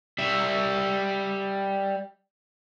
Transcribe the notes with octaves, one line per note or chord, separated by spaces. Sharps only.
G3 E5